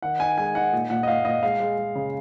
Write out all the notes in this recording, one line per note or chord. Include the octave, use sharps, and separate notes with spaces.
D#3 F#5
D#4 G#5
G#3 G#5
D#4 F#5
A#2
A#2 F#5
D#5
A#2 F5
A#2 D#5
G#3 F5
G#3
G#3
C#3